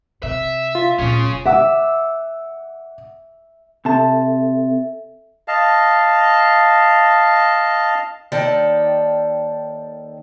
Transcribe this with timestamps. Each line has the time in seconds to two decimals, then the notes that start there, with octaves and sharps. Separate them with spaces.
0.23 C3 E5
0.75 F4
0.99 D1 A#2 C#4 G#4
1.46 E5 F#5 D6 E6
3.85 C3 A4 E5 A5
5.48 D#5 F5 A5
8.32 D#2 D#3 A4 D5 G5 A5